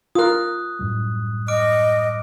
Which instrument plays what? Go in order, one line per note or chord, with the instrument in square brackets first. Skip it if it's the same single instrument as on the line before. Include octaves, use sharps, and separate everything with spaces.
[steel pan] F4 A#4 [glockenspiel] D#6 F#6
[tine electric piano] F#2 A2 G3
[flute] D#5 [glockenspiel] D6 F6 D7